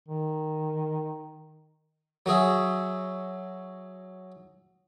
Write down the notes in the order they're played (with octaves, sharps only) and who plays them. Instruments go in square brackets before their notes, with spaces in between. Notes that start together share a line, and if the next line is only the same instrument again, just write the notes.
[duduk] D#3
[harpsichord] F#3 F#4 G#4 E5